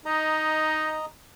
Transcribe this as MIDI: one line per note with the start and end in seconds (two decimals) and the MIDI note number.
0.05 0.96 63
0.05 1.06 75
0.05 1.06 82